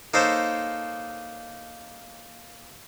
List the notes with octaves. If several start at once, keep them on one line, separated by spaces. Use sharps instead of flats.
A#3 D#4 A4 C5 C#5